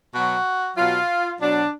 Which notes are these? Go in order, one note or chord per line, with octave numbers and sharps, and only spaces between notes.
B2 F#3 F#4
B2 F#3 F4
B2 F#3 D4